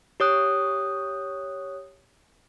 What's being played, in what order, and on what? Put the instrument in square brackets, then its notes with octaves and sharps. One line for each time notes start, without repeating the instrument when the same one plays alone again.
[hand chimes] G4 C#5 D#6 F#6